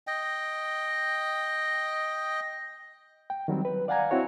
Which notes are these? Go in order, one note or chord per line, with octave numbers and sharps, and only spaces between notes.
D#5 G5
G5
D#3 F#3 G3 C4
B4
D5 F5 F#5 G#5 A#5 G#6
C4 E4 F#4 C#5